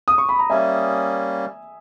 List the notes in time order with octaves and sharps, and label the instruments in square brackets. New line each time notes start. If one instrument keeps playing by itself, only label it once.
[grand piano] D#6
C#6
B5
A#5
[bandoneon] G3 A#3 C#4 [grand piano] E5 G#5